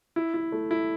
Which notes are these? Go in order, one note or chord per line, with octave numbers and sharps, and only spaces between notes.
E4
E4
A3
E4